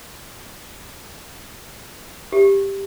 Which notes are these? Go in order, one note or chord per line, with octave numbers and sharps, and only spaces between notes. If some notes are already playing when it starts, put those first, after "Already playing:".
G4